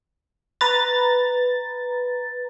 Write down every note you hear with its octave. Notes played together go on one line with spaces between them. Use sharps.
B4 A#5 A6